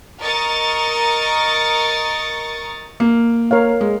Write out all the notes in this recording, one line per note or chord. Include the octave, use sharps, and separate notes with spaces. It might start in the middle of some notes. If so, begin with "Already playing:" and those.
A#4 D#5 C#6 D#6 A6
A#3
A#4 C#5 F5
G#3